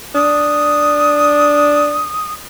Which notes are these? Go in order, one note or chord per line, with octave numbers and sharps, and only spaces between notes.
D4 D#6